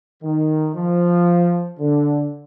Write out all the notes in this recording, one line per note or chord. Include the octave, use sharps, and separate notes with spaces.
D#3
F3
D3